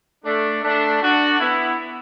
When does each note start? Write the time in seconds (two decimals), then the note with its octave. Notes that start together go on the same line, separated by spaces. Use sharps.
0.25 A3 D4
0.64 A3 D4
1.02 D4 F#4
1.40 B3 E4